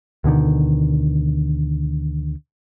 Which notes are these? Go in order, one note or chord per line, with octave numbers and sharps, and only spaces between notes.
D2 B2 D3 D#3